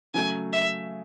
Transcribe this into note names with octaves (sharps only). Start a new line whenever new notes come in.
C#3 F#3 A3 G#5
E5